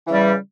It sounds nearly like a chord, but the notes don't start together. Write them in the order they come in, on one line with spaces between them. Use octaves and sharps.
E3 C#3 G3